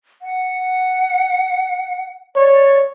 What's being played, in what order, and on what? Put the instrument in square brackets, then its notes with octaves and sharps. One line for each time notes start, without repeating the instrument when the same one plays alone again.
[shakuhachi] F#5
[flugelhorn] C#5 [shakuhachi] D5